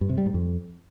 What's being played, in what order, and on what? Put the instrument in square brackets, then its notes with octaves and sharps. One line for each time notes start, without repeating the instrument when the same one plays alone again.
[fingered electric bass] G2
C3
G3
G#2
F2